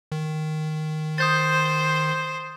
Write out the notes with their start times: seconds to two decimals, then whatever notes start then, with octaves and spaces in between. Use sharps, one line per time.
0.12 D#3
1.18 C5 D#6 G6 A6